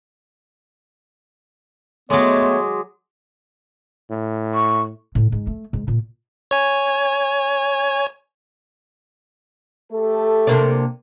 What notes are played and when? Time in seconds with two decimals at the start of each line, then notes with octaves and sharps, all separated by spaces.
2.10 F#3 G#3 A3 B3 C#5 C6 D6 D#6
4.10 A2
4.54 C#6
5.15 A2
5.32 G#2
5.47 A3
5.73 G#2
5.88 A#2
6.51 C#5 G#5
9.92 A3 G4 A4
10.47 C3 A#3 D4